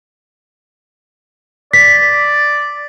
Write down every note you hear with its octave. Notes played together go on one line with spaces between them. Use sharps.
D5 B6